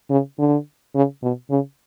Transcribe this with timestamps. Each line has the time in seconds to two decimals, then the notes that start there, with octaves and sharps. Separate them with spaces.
0.10 C#3
0.39 D3
0.95 C#3
1.23 B2
1.51 C#3